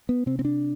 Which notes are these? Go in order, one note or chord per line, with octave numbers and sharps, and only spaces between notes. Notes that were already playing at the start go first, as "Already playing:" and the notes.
B3
C3 C4
C4
D4